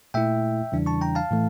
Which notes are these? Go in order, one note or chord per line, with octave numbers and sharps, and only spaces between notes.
A#2 A3 E4 E5 G5
E2 C#3 E3 G3 D4
A5 C#6
G5 A#5
F5 A5
A2 E3 A3